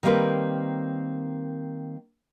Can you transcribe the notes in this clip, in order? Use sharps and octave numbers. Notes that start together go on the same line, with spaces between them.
D#3 G3 A#3 C4 A#4 B4